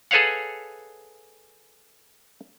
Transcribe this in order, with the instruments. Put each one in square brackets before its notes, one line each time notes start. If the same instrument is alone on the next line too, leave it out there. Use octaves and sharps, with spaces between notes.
[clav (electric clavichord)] G#4 A4 B4 C#5 F5 F#5